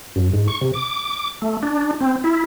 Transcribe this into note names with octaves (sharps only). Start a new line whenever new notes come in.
F#2
G#2
C#6
C3
D6
A3
D4
C4
E4